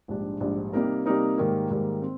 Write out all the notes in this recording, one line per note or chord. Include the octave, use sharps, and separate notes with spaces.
A#1 G#2 G3 D4
A#1 G#2 G3 D4
C3 G3 A#3 D#4 A#4
C3 G3 A#3 D#4 A#4
G#2 D#3 G3 A#3
G#2 D#3 G3 A#3
C4